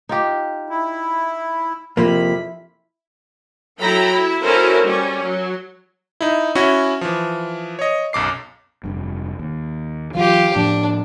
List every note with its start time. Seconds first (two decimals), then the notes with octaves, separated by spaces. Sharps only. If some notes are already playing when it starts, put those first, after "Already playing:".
0.09 D#4 F4 G4
0.70 E4
1.97 F2 C3 F3 A#3 E4 B5
3.79 F#3 E4 A4 G5 A#5 B5
4.11 E4
4.42 C#4 E4 F#4 A4 A#4 C5
4.85 G3 C#4
5.22 F#3
6.21 D#4 E4
6.55 C#4 E4 F#4
7.01 E3 F3
7.79 C#5 D#5
8.13 B1 F#2 D6 C7
8.84 F1 G2
9.39 D#2
10.15 E3 F#3 F4 G4
10.56 A2 F3 D4